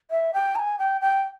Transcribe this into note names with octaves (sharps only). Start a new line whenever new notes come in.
E5
G5
A#5
G#5
G5
G5